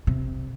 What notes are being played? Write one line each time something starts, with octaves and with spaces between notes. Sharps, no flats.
C3